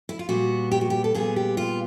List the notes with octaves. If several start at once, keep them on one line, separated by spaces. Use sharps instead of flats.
E4
F4
A#2 G3 B3 F#4
G4
F#4
G4
A4
A#2 G3 B3 G#4
G4
F4